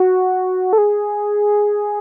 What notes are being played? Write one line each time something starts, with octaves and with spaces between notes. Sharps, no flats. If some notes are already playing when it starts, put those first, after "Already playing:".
Already playing: F#4
A4
G#4